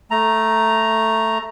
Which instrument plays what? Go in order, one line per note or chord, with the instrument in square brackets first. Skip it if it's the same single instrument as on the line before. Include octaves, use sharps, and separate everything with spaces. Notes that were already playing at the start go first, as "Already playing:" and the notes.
[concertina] A3 A#5